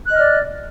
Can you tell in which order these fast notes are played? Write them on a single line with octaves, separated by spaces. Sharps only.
F#6 D#5 F6 D5